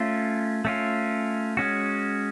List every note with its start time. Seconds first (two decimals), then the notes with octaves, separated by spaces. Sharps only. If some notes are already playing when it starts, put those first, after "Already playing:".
Already playing: A3 C#4 F4
0.65 A3 C#4 F4
1.57 G#3 C#4 F#4